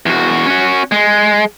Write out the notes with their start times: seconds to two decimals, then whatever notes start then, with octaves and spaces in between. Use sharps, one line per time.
0.06 E2 F#4
0.46 C#4 F#4
0.92 G#3